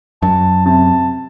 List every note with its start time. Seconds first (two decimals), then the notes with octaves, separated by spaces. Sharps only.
0.22 F#2 A5
0.66 C3 A5